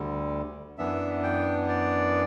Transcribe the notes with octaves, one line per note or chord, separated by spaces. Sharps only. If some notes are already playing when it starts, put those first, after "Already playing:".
Already playing: D2 D3 G3
F#2 E3 B3 D4 E5
G5
D5